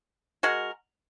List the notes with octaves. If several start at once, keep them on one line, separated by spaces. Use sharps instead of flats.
G#3 F#4 A#4